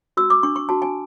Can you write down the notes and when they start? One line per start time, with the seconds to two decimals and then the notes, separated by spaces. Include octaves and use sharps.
0.17 F#4 E6
0.30 D6
0.43 D4 C#6
0.56 C#6
0.69 F#4 A5
0.82 G#5